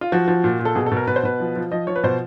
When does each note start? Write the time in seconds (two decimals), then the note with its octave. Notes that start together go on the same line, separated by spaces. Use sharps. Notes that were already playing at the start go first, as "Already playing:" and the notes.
0.01 F4
0.12 F3 F#4
0.28 F3
0.44 A#2
0.59 A#2
0.65 A4
0.75 B2 G#4
0.86 A4
0.91 B2
0.97 A#4
1.07 B2 B4
1.16 C5
1.23 B2 B4
1.40 F3
1.56 F3
1.71 F3 D#5
1.87 F3 C#5
1.96 B4
2.03 B2 C5